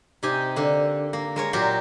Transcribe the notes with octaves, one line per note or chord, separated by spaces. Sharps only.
C3 D#4 G4 G#5
D3 A#3
A#3
G#3 A#4 C#5
A#2 F#3 G4 A#4 C6